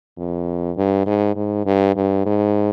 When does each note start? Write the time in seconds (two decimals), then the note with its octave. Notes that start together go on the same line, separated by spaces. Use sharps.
0.18 F2
0.77 G2
1.06 G#2
1.36 G#2
1.66 G2
1.96 G2
2.26 G#2